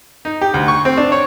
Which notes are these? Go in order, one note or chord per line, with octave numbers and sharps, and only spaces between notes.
D#4
G4
D2
C#6
C4
D4
C#5